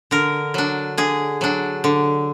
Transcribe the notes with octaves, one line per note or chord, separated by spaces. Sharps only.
D3 A#4
F#3 D4
D3 G#4
F#3 D4
D3